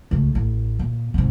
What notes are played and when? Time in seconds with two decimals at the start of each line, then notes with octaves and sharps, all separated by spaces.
0.11 C#2 A3
0.35 A1
0.79 A#2
1.14 G#2 C3